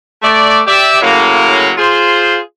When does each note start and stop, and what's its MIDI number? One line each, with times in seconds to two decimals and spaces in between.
0.23 0.61 57
0.23 0.61 74
0.67 0.99 67
0.67 0.99 74
0.67 0.99 76
1.01 1.73 45
1.01 1.73 49
1.01 1.73 54
1.01 1.73 58
1.78 2.38 65
1.78 2.38 68
1.78 2.38 72